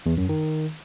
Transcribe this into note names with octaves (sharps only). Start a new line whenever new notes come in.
E2
F#2
D#3